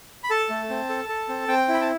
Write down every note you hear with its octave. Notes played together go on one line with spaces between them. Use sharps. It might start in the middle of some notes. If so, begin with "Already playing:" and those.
B5
A4 A5
A3
C4
A4
A4
C4
C4 G5
E4
B5
A5